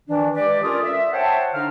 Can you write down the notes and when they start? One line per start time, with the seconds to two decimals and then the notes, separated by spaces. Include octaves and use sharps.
0.07 D#3 E3 D4
0.36 G#3 G4 B4 D5
0.63 C#4 F4 A4 A#4 D5 D#6
0.83 E5
1.13 C5 C#5 F#5 G5 A5
1.54 D3 D4 D#4 F5 A#5 F6